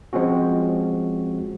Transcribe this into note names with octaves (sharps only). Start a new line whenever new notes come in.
F3 G#3 C4 C#4 F#4